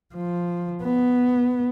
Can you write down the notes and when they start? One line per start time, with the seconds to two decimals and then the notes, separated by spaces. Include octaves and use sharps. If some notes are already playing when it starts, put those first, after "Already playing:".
0.15 F3
0.83 B3